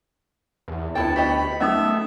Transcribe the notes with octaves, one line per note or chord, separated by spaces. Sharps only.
E2
D2 B3 E4 G5 A5
F#4 G4 D#5 B5
F#3 A3 C#4 D#4 E5 D#6